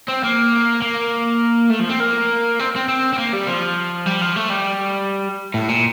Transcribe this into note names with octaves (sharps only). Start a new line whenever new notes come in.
C4
A#3
A#3
A3
F3
C4
A#3
C4
C4
C4
C4
A#3
G3
F3
G3
F3
A3
G3
A2
A#2